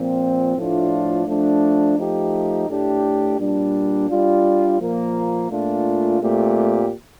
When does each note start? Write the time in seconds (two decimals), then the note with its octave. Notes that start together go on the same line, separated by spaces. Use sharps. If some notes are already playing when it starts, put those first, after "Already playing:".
Already playing: A#2 F3 C4
0.57 A2 F3 A3 D4 F4
1.27 F3 A3 D4
1.98 F3 A3 D#4 G4
2.69 A2 A3 D4 G4
3.38 A#2 G3 D4
4.10 G3 D4 F4
4.80 A#2 F3 A#3
5.50 A#2 A3 D4 F4
6.21 A#2 A3 C4 G4